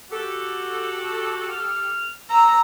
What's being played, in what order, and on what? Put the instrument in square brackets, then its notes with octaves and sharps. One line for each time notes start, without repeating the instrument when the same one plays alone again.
[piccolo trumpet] F#4 [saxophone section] G4 A4
[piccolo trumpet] F6
[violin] A#5 [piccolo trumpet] E6